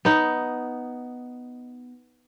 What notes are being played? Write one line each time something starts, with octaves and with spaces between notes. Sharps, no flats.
B3 D#4